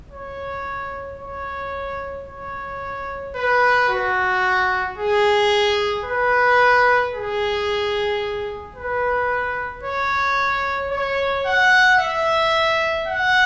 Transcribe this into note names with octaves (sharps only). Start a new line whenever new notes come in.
C#5
C#5
C#5
B4
F#4
G#4
B4
G#4
B4
C#5
C#5
F#5
E5
F#5